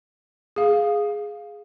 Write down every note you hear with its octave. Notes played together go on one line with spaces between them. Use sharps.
G#4 F5